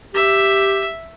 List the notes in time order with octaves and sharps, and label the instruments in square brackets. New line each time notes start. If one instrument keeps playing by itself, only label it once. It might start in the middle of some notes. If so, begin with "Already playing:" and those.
[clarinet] G4 [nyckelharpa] E5